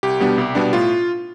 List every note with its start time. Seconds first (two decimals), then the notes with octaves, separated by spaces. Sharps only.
0.03 C2 G4
0.20 B2 G3 B3 D4
0.38 C2
0.55 B2 G3 B3 D4
0.73 A2 F4